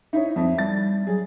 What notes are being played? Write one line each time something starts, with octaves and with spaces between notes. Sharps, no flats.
D#4 E4 C#5 E5
F2
G3 A6
F#3 G#4